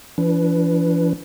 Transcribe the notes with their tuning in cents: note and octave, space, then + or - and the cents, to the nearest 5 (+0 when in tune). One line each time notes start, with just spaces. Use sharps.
E3 +45 D4 -30 B4 +0